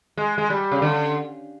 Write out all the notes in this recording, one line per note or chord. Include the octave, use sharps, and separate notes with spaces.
G#3
G#3
G3
C#3
D3